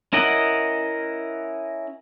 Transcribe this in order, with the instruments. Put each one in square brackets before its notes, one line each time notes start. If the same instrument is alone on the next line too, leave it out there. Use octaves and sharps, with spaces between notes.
[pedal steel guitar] C#4 E4 A#4 D#5 F#5